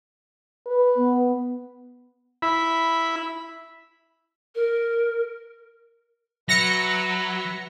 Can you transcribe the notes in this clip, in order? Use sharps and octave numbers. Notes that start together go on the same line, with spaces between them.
B4
B3
E4 B5
A#4
F#3 B4 E5 F#5 A#6 C#7